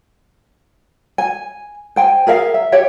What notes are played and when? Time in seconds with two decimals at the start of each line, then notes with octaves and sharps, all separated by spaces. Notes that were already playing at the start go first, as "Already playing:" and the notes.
1.18 G#5
1.96 C5 G5 G#5
2.27 G#4 A#4 E5 F5
2.54 E5
2.72 G4 C#5 E5